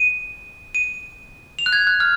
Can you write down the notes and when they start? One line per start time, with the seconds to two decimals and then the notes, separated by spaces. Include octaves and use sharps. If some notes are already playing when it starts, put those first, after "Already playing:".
Already playing: D#7
0.75 D#7
1.59 F7
1.66 F#6
1.73 G#6
1.87 F#6
2.00 F6